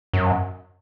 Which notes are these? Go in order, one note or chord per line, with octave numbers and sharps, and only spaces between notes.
F#2